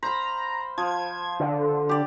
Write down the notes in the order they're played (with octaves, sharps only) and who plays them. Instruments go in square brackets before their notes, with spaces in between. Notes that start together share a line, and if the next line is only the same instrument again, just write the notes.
[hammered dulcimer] C5 F5 B5 [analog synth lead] A#5
[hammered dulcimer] F3 [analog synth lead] G#6
[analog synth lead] D3
[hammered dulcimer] G4 D5